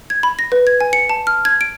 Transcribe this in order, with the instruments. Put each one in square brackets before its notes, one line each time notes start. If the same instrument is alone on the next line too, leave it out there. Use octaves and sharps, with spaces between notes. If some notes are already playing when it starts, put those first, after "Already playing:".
[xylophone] G#6
B5
A#6
B4
G#6
G#5
C#7
A5
F6
G#6
D7